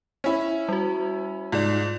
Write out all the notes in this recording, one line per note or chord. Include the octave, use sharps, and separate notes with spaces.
C#4 E4
G3 F#4
G#2 F4 D5